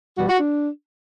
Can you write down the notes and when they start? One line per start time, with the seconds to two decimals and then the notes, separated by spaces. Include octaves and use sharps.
0.17 E2 B2 G3 F#4
0.29 F#4
0.39 D4